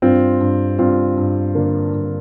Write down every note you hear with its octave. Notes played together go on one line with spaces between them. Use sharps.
G2 C4 F4
G2
G2 C4 F4
G2
D3 A#3 D4
G2